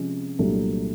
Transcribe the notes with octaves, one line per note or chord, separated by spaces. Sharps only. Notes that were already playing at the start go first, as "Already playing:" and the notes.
Already playing: C3 F3 G#3 C#4
C2 A#2 F#3 A3 D4